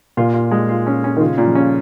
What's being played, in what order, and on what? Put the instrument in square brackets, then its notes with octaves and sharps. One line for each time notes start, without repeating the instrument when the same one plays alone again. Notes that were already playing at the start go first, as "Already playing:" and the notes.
[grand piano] A#2 [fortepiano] F4
[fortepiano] F4
G#3
F4
C#4
C#4
[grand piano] D#3
[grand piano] C#3 [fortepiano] F4
[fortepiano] A#2
[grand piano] F3
[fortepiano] C#4